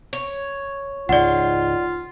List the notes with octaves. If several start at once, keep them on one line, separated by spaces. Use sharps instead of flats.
C#5
C#2 G#2 F4 D5 F#5